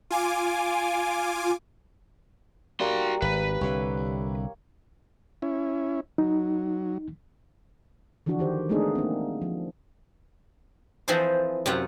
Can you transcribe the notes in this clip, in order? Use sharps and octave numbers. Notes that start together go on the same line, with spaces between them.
F4 G#5 D6
G3 A#3 F#4 C6
G#1 B4 F5
C2 D3 C#5
C#4 E4
F#3 D#4
D3 E3 F3 D4 F#4
D#3 G4 C5
G#3 A3 B3 D4 D#4 G#4
A#3 C4
F3
E3 F3 C4 G#4 A4 C5
F#2 C3 C4 F4 F#5